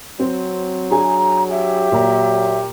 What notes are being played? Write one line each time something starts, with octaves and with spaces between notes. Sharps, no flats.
F#3 C4
D4 G#4 G#5 A#5
G4 E5
A#2 F#3 A#5